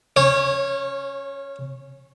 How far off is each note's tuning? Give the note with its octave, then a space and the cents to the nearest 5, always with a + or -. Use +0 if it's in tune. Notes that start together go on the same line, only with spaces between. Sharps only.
C#4 +0 C#5 -30